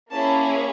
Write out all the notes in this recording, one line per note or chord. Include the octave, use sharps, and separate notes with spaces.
A#3 C#4 E4 G#4 A5